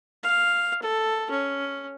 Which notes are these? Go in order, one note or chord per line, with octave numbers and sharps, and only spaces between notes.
F5
A4
C#4